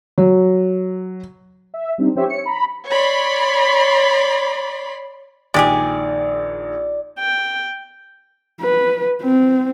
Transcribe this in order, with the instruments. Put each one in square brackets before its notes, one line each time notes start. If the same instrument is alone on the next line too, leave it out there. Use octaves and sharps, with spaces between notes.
[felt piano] F#3
[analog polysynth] E5
G3 C4 D4 D#4
F3 C#4 G4 C5 C#5 E5
C#5 C#7
A#5 B5
[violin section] C#5 D5 B5 C6
[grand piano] A#1 D#3 [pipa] G#3 G4 G#4 [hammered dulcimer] D5
[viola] G5
[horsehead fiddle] B4
C4